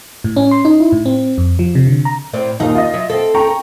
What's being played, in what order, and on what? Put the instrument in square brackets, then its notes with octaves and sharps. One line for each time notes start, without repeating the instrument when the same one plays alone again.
[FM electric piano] A2
C#4
C6
D#4
E4
A2
C4
F2
F3
C3
D3
A#5
[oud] A2 C4 D5
[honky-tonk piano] D#2 A#2 A#3 [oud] D#4
[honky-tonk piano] F4 D#5
[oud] F#3 E5
C4 A4
[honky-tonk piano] G5 A#5 C#6